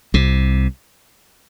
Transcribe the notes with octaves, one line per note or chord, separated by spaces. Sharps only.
C2 C3